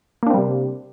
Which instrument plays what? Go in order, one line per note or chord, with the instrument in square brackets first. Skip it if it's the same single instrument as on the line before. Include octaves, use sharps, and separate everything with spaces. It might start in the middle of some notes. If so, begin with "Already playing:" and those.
[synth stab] A#3
D4
C4
G3
C3